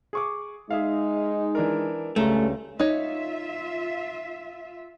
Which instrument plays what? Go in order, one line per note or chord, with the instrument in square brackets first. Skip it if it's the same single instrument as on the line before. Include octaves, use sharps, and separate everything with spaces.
[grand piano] G#4 C#6 D6
[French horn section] G#3 D#4 [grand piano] G#4 E5 F5
[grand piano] E3 D4 A#4
[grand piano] C#2 A#5 [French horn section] G2 C#4 G#4 [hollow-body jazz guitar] A3
[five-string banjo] D#4 C#5 [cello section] F4 E5